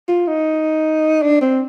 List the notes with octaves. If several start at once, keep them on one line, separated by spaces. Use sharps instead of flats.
F4
D#4
D4
C4